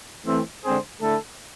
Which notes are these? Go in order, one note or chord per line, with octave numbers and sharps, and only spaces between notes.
E3 A3 C4
D3 G#3 C4 G#4 C5
D3 A3 E4 A4